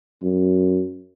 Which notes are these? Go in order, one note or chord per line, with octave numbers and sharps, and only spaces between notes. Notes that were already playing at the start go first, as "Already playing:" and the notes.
F#2